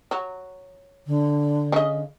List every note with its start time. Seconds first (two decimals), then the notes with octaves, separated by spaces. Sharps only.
0.11 F#3
1.07 D3
1.72 C#3 D#5